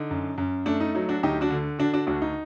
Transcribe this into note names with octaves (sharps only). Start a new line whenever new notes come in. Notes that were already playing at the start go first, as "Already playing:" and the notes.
Already playing: D3 D#4
F#2
F#2
A3 D4
D#4
F#3 D#4
D4 F#4
D2 D#4 G4
D4 F#4
D3
D3 D4 F#4
D4 F#4
D2 D4 F#4
D#4